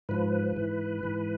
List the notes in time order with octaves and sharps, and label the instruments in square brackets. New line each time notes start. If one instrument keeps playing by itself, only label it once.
[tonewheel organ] G#2 F3 B4
G#2 E3
G#2 E3